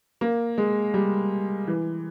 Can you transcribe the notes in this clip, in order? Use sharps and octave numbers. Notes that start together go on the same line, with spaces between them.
A#3
G#3
G3
E3